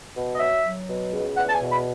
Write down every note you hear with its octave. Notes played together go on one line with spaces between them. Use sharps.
B2
D#5
F#3 E5
F#3
B2
C#2
E2 F#5
A5
G#5
B2
B5